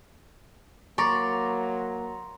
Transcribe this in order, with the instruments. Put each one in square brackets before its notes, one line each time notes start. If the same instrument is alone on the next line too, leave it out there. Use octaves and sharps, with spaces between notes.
[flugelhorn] F#3 [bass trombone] A#3 [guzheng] D5 [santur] A#5 C6 C#6